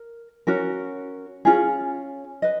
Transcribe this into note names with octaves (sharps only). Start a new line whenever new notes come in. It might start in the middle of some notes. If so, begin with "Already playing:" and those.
Already playing: A#4
C#4 F#4 A#4
C#4 F4 G#4
B4 D#5